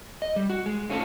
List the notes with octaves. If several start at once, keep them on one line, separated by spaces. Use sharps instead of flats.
D#5
G3
F#4
G#3
G#2 A3 C#4 F4 G4 A4